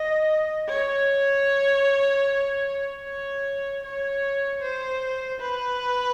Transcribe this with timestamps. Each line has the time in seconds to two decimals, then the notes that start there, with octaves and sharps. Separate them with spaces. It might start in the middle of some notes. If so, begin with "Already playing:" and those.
Already playing: D#5
0.68 C#5
3.04 C#5
3.83 C#5
4.61 C5
5.40 B4